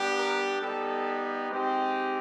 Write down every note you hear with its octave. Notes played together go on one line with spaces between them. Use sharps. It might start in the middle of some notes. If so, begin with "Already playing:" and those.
Already playing: G3 B3 D4 G4
A#4
G3 B3 D#4 G4 A4
G#3 C4 D#4 G4